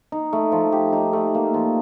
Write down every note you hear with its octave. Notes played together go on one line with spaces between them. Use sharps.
D#4
A3
F3
G4
D#4
A3
A#3
F3